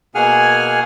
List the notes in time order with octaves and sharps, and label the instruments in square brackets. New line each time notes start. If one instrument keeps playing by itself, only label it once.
[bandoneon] B2 A#3 G#4 F#5 G#5 F6